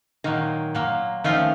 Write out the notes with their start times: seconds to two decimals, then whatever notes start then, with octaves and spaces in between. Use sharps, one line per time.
0.24 A#2 D#3 F#3 A#3
0.74 A#2 F#3 A#3
1.24 D#3 F3 A3 C#4 F4